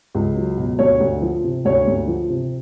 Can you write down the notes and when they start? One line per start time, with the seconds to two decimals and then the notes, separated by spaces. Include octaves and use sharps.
0.15 C#2
0.36 F#3
0.57 B2
0.79 D2 C#5
1.00 D2
1.22 F3
1.44 C3
1.65 D2 C#5
1.87 D2
2.08 F3
2.30 C3